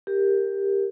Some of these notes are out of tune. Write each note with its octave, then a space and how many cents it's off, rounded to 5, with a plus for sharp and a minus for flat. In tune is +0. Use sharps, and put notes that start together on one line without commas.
G4 +10 A#4 +0